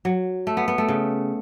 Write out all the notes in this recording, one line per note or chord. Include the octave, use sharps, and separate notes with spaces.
F#3
A3
B3
B3
A3
C#3